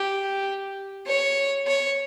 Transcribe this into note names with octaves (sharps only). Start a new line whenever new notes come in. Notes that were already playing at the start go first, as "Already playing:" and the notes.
Already playing: G4
C#5
C#5